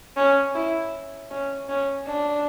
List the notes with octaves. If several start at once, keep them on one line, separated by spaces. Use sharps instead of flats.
C#4
E4
C#4
C#4
D4